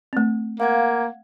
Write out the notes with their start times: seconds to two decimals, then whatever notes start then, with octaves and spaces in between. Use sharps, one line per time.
0.13 A3 C4
0.60 A#3 F5 F#5 G#6